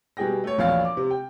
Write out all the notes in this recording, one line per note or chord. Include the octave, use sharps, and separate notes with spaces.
B2 G3 G#4 G5 A#6
A3 C#5
E1 A#1 C#5 F5 A6
D6
C3
G5